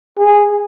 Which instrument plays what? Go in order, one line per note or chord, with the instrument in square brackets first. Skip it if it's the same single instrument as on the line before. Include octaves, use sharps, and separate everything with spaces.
[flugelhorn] G#4